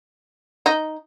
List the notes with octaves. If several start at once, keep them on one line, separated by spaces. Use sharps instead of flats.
D#4